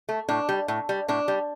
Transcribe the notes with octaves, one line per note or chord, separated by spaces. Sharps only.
A3
A2 D4
G3
A2
G3
A2 D4
G3